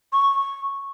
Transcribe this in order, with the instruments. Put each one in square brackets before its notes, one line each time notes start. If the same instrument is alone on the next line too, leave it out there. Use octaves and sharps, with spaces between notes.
[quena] C#6